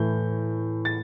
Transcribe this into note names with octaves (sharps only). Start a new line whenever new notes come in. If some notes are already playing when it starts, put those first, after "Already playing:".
Already playing: A2 E3 A3 G6
A6